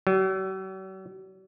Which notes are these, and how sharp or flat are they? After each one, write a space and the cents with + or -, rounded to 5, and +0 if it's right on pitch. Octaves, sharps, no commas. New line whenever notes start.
F#3 +45